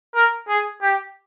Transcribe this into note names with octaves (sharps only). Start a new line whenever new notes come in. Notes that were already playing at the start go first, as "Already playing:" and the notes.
A#4
G#4
G4